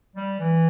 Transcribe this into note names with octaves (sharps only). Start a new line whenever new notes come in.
G3
E3